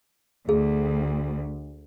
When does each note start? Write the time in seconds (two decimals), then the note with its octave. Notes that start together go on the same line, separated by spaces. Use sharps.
0.49 D2 G#4